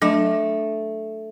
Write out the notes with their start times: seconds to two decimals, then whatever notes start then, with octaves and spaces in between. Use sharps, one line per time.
0.02 F#3 A3 D4